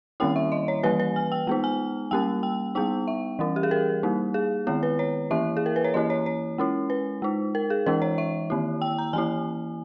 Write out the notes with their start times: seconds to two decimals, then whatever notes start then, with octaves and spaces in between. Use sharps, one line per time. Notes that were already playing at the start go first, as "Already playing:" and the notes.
0.20 D#3 G3 A#3 C#4 E4 G5
0.36 E5
0.52 D#5
0.68 C#5
0.83 E3 G3 A#3 B4
1.00 B4
1.16 G#5
1.32 G5
1.47 G#3 B3 D#4
1.64 G#5
2.11 G3 A#3 C#4 G5
2.43 G5
2.75 G3 B3 D#4 G5
3.08 E5
3.39 E3 G3 C#4
3.56 G4
3.63 G#4
3.71 A#4
4.03 G3 A#3 D#4
4.34 G#4
4.67 D#3 G#3 B3 E4 G#4
4.83 B4
4.99 C#5
5.31 E3 A#3 E4 E5
5.57 G#4
5.66 A#4
5.76 B4
5.84 C#5
5.94 E3 A#3 E4 D#5
6.10 C#5
6.26 C#5
6.58 G#3 C#4 E4
6.90 B4
7.22 G#3 D#4
7.55 A#4
7.70 G#4
7.86 E3 G#3 D#4 A#4
8.02 C#5
8.18 E5
8.50 D#3 A#3 E4
8.82 G5
8.98 A#5
9.13 E3 A#3 E4 G#5